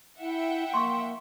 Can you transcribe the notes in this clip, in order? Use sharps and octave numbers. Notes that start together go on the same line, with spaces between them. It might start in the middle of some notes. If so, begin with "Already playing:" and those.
E4 E5 F#5 G5
A#3 C6 C#6